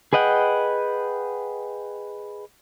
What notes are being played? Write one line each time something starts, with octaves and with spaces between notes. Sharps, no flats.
G#4 B4 D#5 F#5 G5